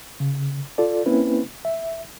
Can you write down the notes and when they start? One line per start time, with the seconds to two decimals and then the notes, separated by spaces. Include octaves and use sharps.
0.20 C#3
0.78 F4 A4 D5
1.06 A#3 C4 C#4 E4 B4
1.65 E5